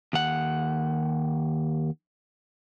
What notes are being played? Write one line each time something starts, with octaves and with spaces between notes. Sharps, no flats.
D#2 F#5